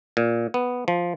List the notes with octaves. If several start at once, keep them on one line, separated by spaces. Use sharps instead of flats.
A#2
B3
F3